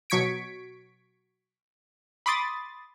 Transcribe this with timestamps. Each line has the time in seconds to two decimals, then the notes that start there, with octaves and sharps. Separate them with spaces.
0.10 B2 F#3 C#6 G#6 B6 D7
2.26 B5 C6 D6 D#6 A6